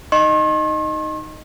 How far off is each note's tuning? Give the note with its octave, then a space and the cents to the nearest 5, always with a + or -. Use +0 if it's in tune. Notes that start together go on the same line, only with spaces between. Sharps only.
D#4 +0 D#5 -15 C6 +45